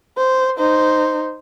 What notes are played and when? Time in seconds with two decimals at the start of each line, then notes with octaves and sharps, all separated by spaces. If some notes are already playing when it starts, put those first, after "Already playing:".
0.18 C5
0.58 D#4 C5